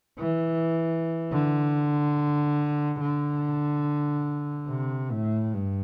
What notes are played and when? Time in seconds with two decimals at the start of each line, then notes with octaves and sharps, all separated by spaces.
0.19 E3
1.32 D3
3.00 D3
4.69 C3
5.11 A2
5.54 G2